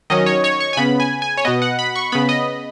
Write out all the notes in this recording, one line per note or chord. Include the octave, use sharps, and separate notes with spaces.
D#3 F#3 C#4 D#5
C#5
C#5
C#6
G#5
C#3 B3 B5
G#5
G#5
C#5
B2 B3 D#5
F#5
B5
C#6
C#3 B3 B5
D#5